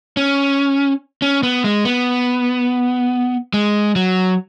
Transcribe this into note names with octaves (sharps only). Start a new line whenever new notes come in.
C#4
C#4
B3
G#3
B3
G#3
F#3